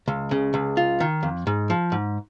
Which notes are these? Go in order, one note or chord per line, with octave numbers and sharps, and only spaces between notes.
C#2
C#3
C#2
F4
D#3
F2
G#2
F3
G#2